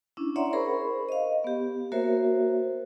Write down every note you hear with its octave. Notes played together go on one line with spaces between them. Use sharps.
C#4 D4 E4
C#5 D5 E5 F#5 A#5 C6
G#4 A#4 C5 B5 C#6
D#5 F5
B3 G4
A#3 F#4 A#4 C5 C#5 E5